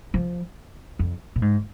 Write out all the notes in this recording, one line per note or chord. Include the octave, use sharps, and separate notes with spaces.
F3
F2
A#2
G#2